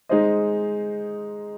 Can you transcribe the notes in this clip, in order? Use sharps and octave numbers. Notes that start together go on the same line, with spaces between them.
G#3 D#4 G#4 C5 D#5